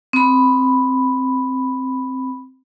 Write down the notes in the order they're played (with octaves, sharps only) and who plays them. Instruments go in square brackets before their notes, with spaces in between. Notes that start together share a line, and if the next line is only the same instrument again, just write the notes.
[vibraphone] C4 B5